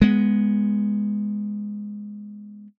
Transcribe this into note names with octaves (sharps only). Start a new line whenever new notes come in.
G#3 B3